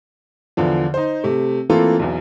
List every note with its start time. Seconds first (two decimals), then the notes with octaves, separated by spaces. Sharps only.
0.57 E2 D3 F3
0.94 D#4 C5
1.24 C3 A3
1.69 E3 A3 A#3 C4 F4 A4
1.99 B1 E2